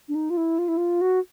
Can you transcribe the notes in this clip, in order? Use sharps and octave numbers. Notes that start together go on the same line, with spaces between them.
D4
D#4
F4
E4
F4
E4
F4
F#4